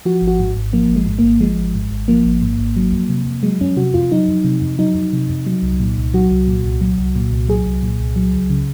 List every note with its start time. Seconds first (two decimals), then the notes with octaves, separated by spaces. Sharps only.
0.05 F3 F#4
0.22 G#1
0.27 F#4
0.39 G#2
0.57 G#1
0.73 F3 A#3
0.89 G#1
0.96 G#3
1.06 G#2
1.19 G#1 A#3
1.41 F3 G#3
1.58 G#1
1.74 G#2
1.91 G#1
2.08 F3 A#3
2.25 G#1
2.42 G#2
2.59 G#1
2.76 F#3
2.92 F2
3.09 C3
3.26 F2
3.43 F#3 G#3
3.61 F2 C#4
3.77 C3 F#4
3.94 F2 F4
4.12 F#3 D#4
4.28 F2
4.44 C3
4.62 F2
4.79 F#3 D#4
4.95 F2
5.13 C3
5.30 F2
5.47 F#3
5.62 C2
5.80 A#2
5.97 C2
6.14 F#3 F#4
6.31 C2
6.48 A#2
6.64 C2
6.81 F#3
6.98 C2
7.16 A#2
7.32 C2
7.48 F#3 G#4
7.66 C2
7.83 A#2
8.00 C2
8.16 F#3
8.33 C#2
8.50 C#3